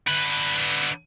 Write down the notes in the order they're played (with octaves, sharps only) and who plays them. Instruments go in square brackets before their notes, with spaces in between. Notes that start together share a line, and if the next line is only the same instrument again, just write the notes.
[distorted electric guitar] D3 B4